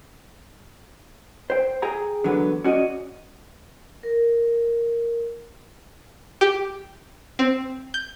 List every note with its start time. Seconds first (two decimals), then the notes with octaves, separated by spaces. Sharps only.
1.50 C5 G5
1.82 G#4 G5 A#5
2.24 D3 E3 F#3 B3
2.64 C#4 F#4 D5 D#5
4.03 A#4
6.41 G4
7.39 C4
7.94 G6